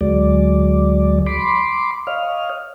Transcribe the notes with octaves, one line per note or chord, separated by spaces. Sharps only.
D2 F#3 G#3 D5
B5 C6 D6
C#5 D#5 F5 F6